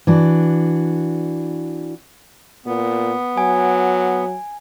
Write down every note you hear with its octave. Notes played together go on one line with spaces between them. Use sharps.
E3 D4 F#4
A#2 B3
F#3 G#5